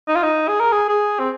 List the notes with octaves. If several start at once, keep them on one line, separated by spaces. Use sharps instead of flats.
D#4
F4
D#4
G#4
A#4
G#4
G#4
C4